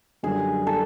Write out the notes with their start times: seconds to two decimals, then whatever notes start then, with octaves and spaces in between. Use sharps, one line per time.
0.23 F#2 D3 G3 G#4
0.67 A4